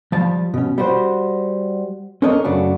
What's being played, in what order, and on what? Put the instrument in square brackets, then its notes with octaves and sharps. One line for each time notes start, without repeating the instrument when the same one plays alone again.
[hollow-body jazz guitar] F3 G3 A5
B2 C#4
G3 F#4 C5
C#4 D4 A4 A#4 C#5 D#5
F#2 C#3 A3 D4 F#4